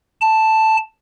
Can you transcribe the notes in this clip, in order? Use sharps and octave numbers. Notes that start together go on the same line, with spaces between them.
A5